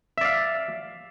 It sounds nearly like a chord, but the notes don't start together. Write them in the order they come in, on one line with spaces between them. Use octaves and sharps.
E5 D5 F5